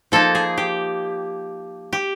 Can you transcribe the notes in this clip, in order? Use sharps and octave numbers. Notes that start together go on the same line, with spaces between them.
F3 A#3 D#4 A4
G#4
G4
G4